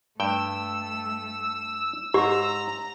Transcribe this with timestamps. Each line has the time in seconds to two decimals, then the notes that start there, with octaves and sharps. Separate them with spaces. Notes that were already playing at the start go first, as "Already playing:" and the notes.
0.20 G2 A3 G5 E6
2.14 G#2 G4 A#5